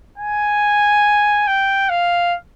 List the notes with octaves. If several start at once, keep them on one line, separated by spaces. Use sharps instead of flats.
G#5
G5
F5